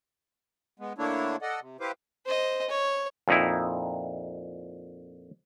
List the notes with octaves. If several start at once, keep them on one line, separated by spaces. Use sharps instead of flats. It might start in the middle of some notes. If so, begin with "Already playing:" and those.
G#3 B3
D3 A3 A#3 D4 E4 C#5
A4 D5 D#5 F#5
C3
E4 G4 B4 C5 F5 D6
C5 D#5
C#5
F2 A#2 D#4 E4